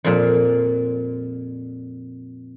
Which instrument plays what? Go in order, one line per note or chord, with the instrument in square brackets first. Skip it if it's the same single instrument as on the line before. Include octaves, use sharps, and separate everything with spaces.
[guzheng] F2 A#2